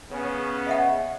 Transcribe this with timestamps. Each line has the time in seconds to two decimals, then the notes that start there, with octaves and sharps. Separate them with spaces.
0.11 C#3 B3 C#4
0.67 D#5 E5 F#5